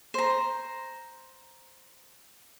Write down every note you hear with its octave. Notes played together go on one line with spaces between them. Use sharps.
C5 A#5